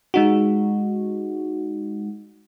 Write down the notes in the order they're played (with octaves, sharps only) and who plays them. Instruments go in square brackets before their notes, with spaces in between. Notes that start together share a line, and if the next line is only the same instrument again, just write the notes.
[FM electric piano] G#3 D#4 F#4